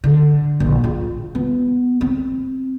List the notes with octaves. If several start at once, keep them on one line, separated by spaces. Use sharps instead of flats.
D3
A#1
F4
B3
C4